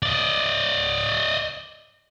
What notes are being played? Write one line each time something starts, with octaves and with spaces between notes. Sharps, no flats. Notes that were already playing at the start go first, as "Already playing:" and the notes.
D5 D#5